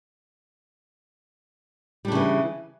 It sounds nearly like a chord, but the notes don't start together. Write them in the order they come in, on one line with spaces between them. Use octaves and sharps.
G3 D4 C#3 E3